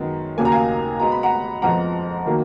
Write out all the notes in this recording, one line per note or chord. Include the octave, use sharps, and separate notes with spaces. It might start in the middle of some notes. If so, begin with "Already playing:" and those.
Already playing: F#2 D#3 G#3 B3
D#2 C#3 F#3 A#3 G#5
A#5
F5 G#5
B2 G#3 B3 A#5
B5
F#5 A#5
F2 F3 G#3 B3 F#5 A#5
D#3 F#3 A#3